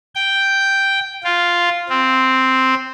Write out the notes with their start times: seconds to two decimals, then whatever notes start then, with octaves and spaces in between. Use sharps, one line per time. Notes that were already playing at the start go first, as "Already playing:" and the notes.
0.15 G5
1.24 F4
1.89 C4